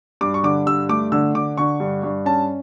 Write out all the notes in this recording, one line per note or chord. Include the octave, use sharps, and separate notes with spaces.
G2 D6
C#6
D3 D6
G2 E6
A3 D6
D3 E6
D3 D6
D3 C#6
G2
G2
C#4 A5